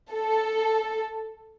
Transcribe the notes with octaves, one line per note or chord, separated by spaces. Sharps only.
A4